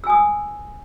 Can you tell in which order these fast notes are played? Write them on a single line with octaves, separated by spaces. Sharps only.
E6 G#5 D#6